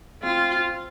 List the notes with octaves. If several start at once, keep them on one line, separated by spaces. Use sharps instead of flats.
C4 F4